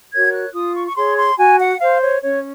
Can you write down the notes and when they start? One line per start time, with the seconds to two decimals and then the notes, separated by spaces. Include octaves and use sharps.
0.13 F#4 A#4 C#5 G#6
0.33 F#6
0.55 F4 D#6
0.75 C#6
0.87 C#6
0.96 G#4 C#5 C6
1.17 C6
1.38 F#4 G#5
1.59 F#5
1.80 C5 F5
2.01 C#5
2.22 C#4 C#5